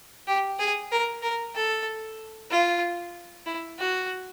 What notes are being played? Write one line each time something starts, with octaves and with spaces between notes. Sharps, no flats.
G4
G#4
A#4
A#4
A4
F4
E4
F#4